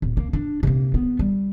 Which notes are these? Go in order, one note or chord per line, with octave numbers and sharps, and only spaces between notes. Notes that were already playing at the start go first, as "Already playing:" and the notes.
D1
A#3
D4
C3 A#3
B3
G3